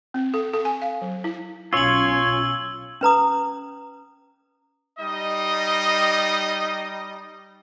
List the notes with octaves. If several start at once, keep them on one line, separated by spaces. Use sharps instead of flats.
C4
A4
A4
G#5
F5
F#3
E4
B1 C#4 F4 C#5 G#5 E6 F#7
C#4 B4 A#5 D#6
G3 D#4 D#5